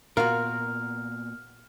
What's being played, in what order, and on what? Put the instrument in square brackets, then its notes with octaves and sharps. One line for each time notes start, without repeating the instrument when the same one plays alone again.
[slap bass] A#2 B3 [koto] F4 [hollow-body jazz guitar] F#4 A#4 [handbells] F6